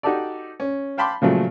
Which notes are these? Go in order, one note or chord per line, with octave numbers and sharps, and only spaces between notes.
D#4 F#4 G4 A4 D5
C#4
F5 G5 A5 B5 C6 D6
A#2 C#3 F3 F#3 A3